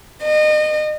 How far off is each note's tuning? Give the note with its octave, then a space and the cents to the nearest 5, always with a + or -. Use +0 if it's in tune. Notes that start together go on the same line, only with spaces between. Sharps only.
D#5 -30